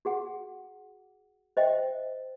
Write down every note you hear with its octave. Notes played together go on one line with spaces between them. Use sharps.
F#4 G#4 F#5
C5 D#5 E5 G5